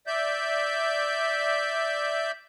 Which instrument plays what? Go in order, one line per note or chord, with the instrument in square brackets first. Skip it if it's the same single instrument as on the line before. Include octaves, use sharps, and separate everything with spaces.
[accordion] D5 E5 G6